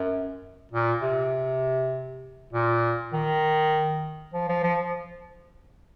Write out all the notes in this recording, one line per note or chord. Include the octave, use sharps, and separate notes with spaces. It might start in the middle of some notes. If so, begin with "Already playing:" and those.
Already playing: F#2
A#2
C3
A#2
D#3
F3
F3
F3